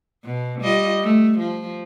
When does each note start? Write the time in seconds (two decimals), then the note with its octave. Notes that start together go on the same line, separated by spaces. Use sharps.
0.24 B2
0.61 G3 F4 D#5
1.03 A3
1.38 F3